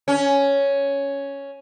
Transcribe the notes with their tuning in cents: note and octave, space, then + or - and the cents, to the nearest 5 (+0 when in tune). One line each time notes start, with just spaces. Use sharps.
C#4 +5